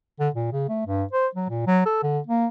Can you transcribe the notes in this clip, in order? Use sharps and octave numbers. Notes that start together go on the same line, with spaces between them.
D3
A#2
C#3
A3
G2
C5
F#3
A#2
F#3
A4
D3
A#3